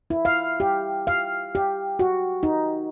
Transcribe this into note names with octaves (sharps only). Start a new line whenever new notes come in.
E4
F5
G4
F5
G4
F#4
D#4